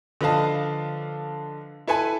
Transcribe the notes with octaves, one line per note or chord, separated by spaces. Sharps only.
D3 F3 B4 D#5 F5 A5
E4 A4 B4 G#5 B5